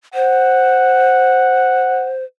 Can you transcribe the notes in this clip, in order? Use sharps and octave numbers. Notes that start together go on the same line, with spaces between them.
C5 F#5